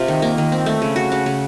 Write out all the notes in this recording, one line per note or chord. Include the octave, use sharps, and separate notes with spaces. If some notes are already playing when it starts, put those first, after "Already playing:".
Already playing: C3 F4
D#3
A#3
D#3
C4
A3
C#3
F#4
C#3
C#3